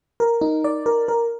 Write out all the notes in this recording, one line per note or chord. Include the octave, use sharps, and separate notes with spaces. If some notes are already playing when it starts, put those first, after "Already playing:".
A#4
D#4
D5
A#4
A#4